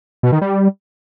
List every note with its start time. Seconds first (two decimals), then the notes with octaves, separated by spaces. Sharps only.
0.23 B2
0.32 D#3
0.42 G3